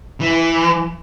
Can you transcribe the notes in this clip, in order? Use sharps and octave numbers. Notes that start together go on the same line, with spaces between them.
E3